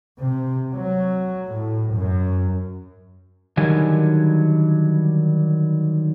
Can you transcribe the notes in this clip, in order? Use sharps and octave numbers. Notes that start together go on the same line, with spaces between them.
C3
F#3
A2
F#2
D3 D#3 F#3 G3 G#5